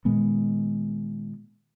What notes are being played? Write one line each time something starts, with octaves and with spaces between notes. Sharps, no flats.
A#2 D#3 G#3 B3